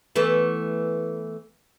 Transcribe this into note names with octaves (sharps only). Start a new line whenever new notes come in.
E3 A3 B3